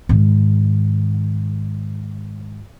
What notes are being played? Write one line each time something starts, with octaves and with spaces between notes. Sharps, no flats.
G#2 D#3